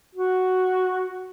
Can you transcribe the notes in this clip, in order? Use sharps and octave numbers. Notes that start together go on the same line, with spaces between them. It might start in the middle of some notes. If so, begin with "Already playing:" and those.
F#4